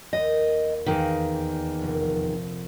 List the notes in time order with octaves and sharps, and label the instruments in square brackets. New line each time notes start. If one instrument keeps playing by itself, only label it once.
[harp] D#2 [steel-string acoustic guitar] D#5
[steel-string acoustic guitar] E2 G#2 D#3 [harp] F5
[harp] G4
F1 A#1